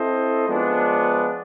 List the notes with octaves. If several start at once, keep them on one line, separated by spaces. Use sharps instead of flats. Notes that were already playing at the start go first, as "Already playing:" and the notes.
Already playing: C4 E4 A4 C5 D#5
F3 G#3 B3 D4